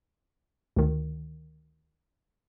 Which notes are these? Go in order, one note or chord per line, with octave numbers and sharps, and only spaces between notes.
D2 D#3